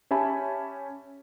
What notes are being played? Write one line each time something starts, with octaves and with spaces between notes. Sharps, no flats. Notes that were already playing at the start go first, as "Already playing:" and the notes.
C#4 G4 E5 G#5 A5 B5